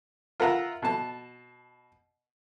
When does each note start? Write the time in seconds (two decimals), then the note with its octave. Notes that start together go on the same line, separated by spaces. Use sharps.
0.40 F4 A#4 E5 F#5 A#5
0.82 B2 A5